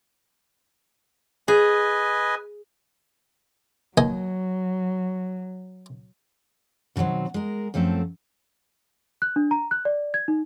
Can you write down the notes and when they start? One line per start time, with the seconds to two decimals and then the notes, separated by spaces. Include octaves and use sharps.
1.48 G#4 B4 D#5 G#5
3.98 D#2 F#3 D#5 G#5
6.96 B2 D3 D#3 F#3 C4
7.34 G#3 A#4
7.74 F#2 F3 A3 C4 A4
9.22 F#6
9.36 D4
9.51 A#5
9.71 F#6
9.85 D5
10.14 G#6
10.28 D#4